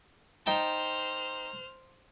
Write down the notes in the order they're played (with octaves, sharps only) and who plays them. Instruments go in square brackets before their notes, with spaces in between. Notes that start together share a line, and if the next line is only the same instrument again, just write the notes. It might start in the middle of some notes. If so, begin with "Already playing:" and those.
[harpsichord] D#4 G5 A5 [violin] C5 F6